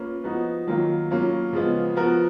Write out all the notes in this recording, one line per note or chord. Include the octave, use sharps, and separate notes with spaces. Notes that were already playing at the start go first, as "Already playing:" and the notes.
Already playing: A#3 C#4 F4 B4
F3 B3 D#4 F#4
D#3 F#3 A#3 F4
F#3 A#3 C#4 F4
C#3 F3 G#3 B3 F4
F3 B3 F#4 A#4